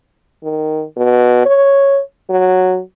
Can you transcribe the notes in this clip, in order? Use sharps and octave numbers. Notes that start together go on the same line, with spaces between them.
D#3
B2
C#5
F#3